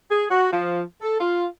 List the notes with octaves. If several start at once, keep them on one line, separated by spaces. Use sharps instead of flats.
G#4
F#4
F3
A4
F4